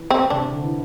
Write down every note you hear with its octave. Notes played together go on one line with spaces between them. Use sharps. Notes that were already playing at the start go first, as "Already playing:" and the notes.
Already playing: E3
C4
C3 D4
D3
E3